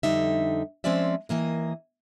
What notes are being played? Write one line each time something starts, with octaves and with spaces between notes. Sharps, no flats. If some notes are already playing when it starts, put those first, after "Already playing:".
F2 D3 G3 D#4 E5
F3 G#3 C4 C#4 D5 E5
D#2 E3 A#3 D#5